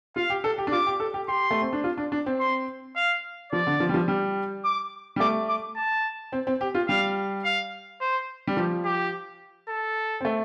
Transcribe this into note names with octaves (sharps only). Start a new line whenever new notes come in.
F4 F5
G4
A4
G4
D4
F4 D6
G4
A4
G4
G4 C6
A3
C4
D4
F4
D4
D4
C4
C6
F5
F3 D5
D3
F3
G3
F3
G3
D6
G3
A3 D6
D6
A5
C4
C4
G4
F4
G3 F5
F5
C5
G3
F3 G4
G4
A4
C4
A3